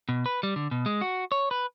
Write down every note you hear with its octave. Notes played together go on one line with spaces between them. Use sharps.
B2
B4
G3
D3
B2
G#3
F#4
C#5
B4